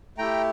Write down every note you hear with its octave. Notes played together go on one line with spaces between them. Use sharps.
A3 E4 G4 G5 A#5